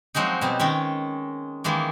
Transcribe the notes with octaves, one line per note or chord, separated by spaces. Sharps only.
F3 F#3 G#3 C4 D#4
B2 G3 C4
D#3 G#3 C#4
D#3 E3 G#3 A#3